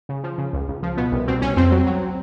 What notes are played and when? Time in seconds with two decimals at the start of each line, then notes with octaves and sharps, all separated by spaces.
0.09 C#3
0.24 F3
0.38 C#3
0.53 C#2
0.68 C#2
0.83 F3
0.97 B2 B3
1.12 C2
1.27 B2 C4
1.42 C2 C#4
1.56 F2 C4
1.72 F#3
1.86 F#3